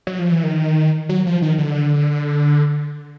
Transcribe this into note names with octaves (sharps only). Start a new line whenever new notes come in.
F#3
F3
E3
D#3
F#3
F3
D#3
D3